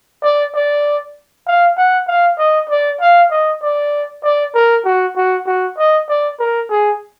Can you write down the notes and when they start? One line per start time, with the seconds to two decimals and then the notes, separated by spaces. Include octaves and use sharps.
0.23 D5
0.54 D5
1.47 F5
1.77 F#5
2.07 F5
2.38 D#5
2.69 D5
3.00 F5
3.31 D#5
3.62 D5
4.23 D5
4.55 A#4
4.85 F#4
5.16 F#4
5.46 F#4
5.78 D#5
6.09 D5
6.39 A#4
6.70 G#4